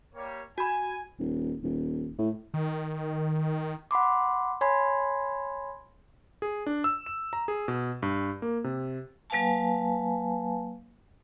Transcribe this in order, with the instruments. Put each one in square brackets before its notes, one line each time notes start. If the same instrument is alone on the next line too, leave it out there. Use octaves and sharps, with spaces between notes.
[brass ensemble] G3 A#3 C#5
[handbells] F#4 B5 [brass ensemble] G#5
[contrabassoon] D#1
D#1
A2
[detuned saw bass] D#3
[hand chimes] F#5 B5 C6 D6
C#5 G#5 B5 C6 G#6
[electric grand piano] G#4
D4
E6
E7
A#5
G#4
B2
G2
A#3
C3
[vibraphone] F#3 A#3 B4 F5 G#5 A5